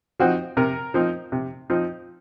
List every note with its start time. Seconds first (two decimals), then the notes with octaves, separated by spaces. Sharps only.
0.20 F3 C4 D#4 F#4
0.57 C3 A#4
0.94 F3 C4 D#4
1.32 C3
1.70 F3 C4 D#4